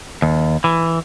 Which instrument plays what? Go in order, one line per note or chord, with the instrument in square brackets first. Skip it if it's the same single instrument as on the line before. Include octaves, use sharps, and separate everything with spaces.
[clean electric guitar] D#2
E3